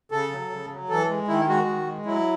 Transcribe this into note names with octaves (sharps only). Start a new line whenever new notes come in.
C#3 A4
F#3
C#3
F#3
E3 A4
G#3
D#3 E4
G#3 F#4
D#3
G#3
F#3 E4